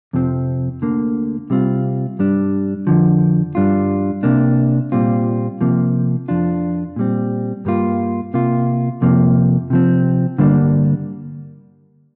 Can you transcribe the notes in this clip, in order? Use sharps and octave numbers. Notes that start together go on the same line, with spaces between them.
F2 C3 F3 C4
D2 D3 A#3
C3 G3 C4 F4
G2 G3 D4
F2 D3 F3
G2 G3 D4 F4
C3 A#3 D4
A#2 G3 C4 F4
C3 F3 A#3
F2 F3 D4 F4
A#2 G3 C4
G2 G3 A#3 F4
C3 A#3 F4
F2 C3 F3 A#3
C3 F3 C4
G2 D3 G3 A#3 D4